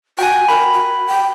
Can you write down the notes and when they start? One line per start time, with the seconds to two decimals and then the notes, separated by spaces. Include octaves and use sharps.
0.19 F#4 G5 G#5
0.48 A#4 B5
0.74 F#4
1.07 G5